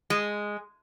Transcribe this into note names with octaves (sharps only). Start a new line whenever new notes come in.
G#3